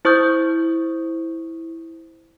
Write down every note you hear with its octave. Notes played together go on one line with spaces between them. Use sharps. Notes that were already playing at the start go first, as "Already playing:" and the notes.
E4 C5 C#6 D#6 G6